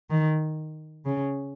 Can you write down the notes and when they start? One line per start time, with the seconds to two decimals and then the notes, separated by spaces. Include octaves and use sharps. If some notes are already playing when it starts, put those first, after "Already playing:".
0.10 D#3
1.06 C#3